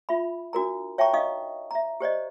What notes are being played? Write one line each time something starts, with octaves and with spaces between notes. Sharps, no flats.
F4 E5 B5
D4 F#4 A#4 A#5
C#5 E5 G5 A5 A#5 C#6
D#4 D#5 F5 C#6 D#6
E5 A#5
G4 C5 D5 D#5